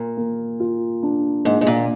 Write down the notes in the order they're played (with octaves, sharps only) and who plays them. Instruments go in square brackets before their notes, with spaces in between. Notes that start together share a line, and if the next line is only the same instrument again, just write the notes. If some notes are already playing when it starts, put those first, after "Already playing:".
Already playing: [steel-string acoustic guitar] A#2 [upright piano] A#4
[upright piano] A#3
F4
D4
[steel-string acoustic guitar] G#2 [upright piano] A#3
[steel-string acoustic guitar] G#2
A#2